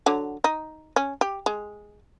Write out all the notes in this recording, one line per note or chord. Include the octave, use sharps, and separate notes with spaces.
D3 F#3
D#4
C#4
G4
G#3